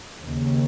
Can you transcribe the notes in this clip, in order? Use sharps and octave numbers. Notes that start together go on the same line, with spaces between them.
D#2 C#3